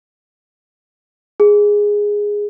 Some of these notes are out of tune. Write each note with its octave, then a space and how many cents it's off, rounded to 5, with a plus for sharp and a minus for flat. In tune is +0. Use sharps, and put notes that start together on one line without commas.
G#4 -5